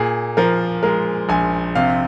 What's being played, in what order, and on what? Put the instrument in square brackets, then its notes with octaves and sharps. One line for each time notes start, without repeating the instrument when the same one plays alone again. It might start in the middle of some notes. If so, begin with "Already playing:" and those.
Already playing: [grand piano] A#2 [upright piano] G#4
[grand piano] F3 [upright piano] A#4
[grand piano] G#3 [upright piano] A#4
[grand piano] A#1 [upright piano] G#5
[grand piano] C3 [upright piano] F5